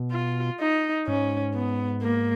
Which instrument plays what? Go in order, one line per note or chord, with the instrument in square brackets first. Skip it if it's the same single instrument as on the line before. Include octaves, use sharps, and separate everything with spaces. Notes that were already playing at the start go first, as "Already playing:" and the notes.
Already playing: [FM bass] B2
[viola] F4
D#4
[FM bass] G#2 [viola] C#4
[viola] B3
A#3